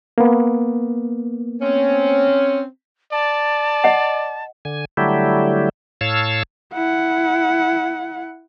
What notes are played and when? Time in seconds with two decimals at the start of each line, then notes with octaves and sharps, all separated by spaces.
0.18 A#3 B3
1.62 C4 C#4
3.12 D5 A5
3.84 D#5 F#5
4.65 D3 G#5
4.97 D3 F#3 G3 A3 E4 G4
6.01 A2 C#5 F5 A5 E6
6.73 E4 F#5